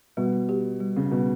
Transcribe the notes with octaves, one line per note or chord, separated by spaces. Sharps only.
B2 G3
G4
G3
C#3
B2 G3